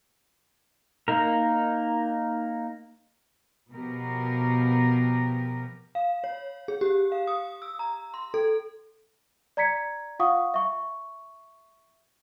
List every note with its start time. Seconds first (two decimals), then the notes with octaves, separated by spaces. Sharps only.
1.08 A#3 D#4 A#4
3.72 B2 F3 B3 G4 A#4
5.95 F5
6.24 C#5
6.68 G#4
6.81 G4
7.12 F5
7.27 D#6
7.62 E6
7.79 A#5
8.14 C6
8.34 A4
9.57 D5 A#5 G#6 B6 C#7
10.19 F4 F5 F#5 C#6 D#6
10.54 E5 C#6